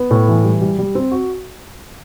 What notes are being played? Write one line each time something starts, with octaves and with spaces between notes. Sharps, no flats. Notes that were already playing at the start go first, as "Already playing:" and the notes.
Already playing: B3
A2
E3
G3
G3
G3
C4
F#4